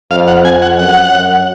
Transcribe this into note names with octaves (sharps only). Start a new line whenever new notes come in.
F2 F5
F#5
F2 G#5
F#5
F#2 F#5
F#2